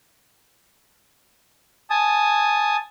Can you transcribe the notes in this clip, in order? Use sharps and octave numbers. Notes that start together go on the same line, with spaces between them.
G#5 A5 D#6